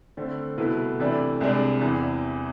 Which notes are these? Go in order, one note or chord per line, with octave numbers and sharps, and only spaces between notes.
D3 A3 C4
C2 B2 A3 E4 B4
C3 E3 A3 D4
C2 C3 G#3 D4
E2 C3 E3